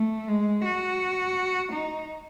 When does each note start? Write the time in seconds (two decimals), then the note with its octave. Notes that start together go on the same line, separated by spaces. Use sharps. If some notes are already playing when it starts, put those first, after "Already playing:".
Already playing: A3
0.28 G#3
0.65 F#4
1.72 D#4